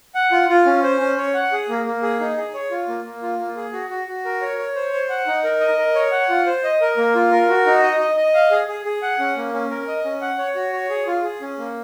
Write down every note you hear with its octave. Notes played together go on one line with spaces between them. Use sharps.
F#5
F4
F4
C#4
C5
C#4
C#5
F#5
G#4
A#3
A#3
G#4
D#4
G#4
C#5
F4
A#3
A#3
F4
A#3
G#4
F#4
F#4
F#4
A#4
C#5
C#5
C5
C5
F#5
D#4
A#4
D#5
A#4
C#5
F#5
F4
C5
D#5
A#4
A#3
F4
A#4
F#4
D#4
D#5
D#5
D#5
F5
G#4
G#4
G#4
F#5
C#4
A#3
C#4
A#4
D#5
C#4
F#5
C#5
F#4
C#5
G#4
F4
G#4
C#4
A#3